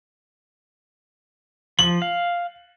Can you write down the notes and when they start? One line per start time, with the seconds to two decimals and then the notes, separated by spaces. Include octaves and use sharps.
1.79 F3 F#7
2.02 F5